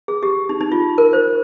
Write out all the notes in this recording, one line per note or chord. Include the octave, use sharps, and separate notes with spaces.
G#4
G4
D#4
D#4
F4
A#4
C5